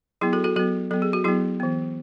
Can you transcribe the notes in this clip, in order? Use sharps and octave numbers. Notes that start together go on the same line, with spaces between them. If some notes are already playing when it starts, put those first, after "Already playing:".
F#3 B3 E4 G#4
F#4 A4
F#4 A4
F#3 B3 F#4 A4
F#3 B3 A4
G#4
F#4
F#3 B3 E4 G#4
E3 B3